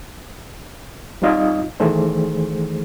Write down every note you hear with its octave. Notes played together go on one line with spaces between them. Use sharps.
G3 C4 D#4 F4 D#5 F5
D#3 E3 A3 G#4 C5